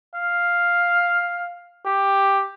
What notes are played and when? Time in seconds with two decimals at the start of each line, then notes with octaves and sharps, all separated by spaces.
0.15 F5
1.87 G4